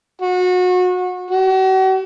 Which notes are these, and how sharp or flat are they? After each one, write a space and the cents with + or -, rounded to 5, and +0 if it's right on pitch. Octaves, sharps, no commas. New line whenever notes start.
F#4 -30
F#4 +40